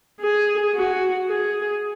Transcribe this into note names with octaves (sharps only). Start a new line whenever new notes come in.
G#4
F#4
G#4